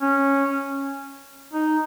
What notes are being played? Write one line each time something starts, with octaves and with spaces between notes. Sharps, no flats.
C#4
D#4